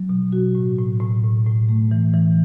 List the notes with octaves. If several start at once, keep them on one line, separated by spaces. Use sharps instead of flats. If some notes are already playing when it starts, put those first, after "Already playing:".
Already playing: F#3
B2
F#4
A2
A2
A2
A2
A2
A3
E3
E3